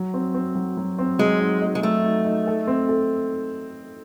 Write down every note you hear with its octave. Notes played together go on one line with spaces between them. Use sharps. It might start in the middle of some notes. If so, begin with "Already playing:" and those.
Already playing: F#3
C4
C4
F#3
F#3
C4
F#3 G#3
D#4
D#4
G#3
F#3 A3
D#4
D#4
A4
C4
A4